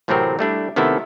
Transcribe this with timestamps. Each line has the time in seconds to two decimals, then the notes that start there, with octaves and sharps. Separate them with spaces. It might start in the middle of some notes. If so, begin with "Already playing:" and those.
0.08 A1 A2 C3 F#3 C4 A#4
0.39 G3 A3 D4 E4
0.76 C3 D#3 A3 B3 E4 A4